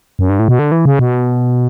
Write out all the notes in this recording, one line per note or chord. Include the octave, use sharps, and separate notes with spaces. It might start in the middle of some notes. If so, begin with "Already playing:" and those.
F#2
G2
A2
B2
D3
E3
C#3
B2